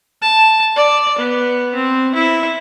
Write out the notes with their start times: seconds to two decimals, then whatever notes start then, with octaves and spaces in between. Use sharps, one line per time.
0.22 A5
0.76 D5
1.18 B3
1.74 C4
2.15 E4